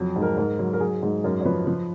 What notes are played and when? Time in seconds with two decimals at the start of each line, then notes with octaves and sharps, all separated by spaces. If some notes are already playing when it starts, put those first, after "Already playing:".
Already playing: F2 F#3
0.16 G#2
0.22 A#4
0.37 G#2 A#4
0.59 F#3
0.73 A#4
0.80 F#3 G#4
1.02 G#2
1.24 F#2 A#4
1.40 C#5
1.45 F3 B4
1.67 F3